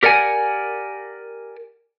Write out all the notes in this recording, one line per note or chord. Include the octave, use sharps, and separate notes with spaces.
G4 A#4 D5 F#5 G#5